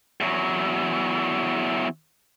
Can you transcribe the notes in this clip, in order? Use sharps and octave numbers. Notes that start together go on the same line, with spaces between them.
E2 F#3